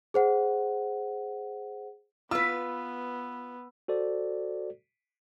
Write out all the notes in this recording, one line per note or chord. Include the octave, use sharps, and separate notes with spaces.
G#4 C5 F#5
B3 F4 B4 E6
F#4 A4 C5 D5